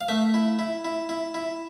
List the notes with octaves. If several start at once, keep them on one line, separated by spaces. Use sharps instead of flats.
F5
A3 E5
E4
E4
E4
E4
E4